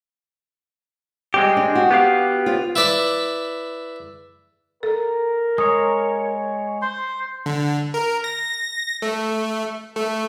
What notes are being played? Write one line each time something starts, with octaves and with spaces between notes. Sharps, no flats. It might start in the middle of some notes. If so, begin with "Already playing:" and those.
G3 G#3 C4 G4
D4
F#4
B3 G4 F5
F4 C5
E4 B4 D5 B5
A4 A#4
G#3 C#5 D#6
C5 C6
D3
A#4
A#6
A3
A3